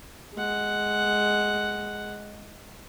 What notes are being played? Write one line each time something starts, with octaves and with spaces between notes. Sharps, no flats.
G#3 F#5